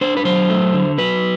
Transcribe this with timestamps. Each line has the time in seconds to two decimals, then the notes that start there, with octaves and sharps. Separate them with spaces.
0.01 D4 C5
0.17 B4
0.25 F#3 C5
0.50 A3
0.74 D3
0.98 F#3 B4